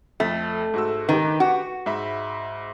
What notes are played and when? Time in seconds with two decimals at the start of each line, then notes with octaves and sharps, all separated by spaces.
0.20 F2 A3
0.74 G#2 F#4 E6
1.09 D#3 G4 B4
1.40 F#4
1.86 G#2 E5 B5